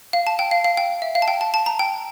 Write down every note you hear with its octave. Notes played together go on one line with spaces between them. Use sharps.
F5
A5
G5
F5
F5
G5
E5
F5
A5
G5
A5
A5
A#5
G5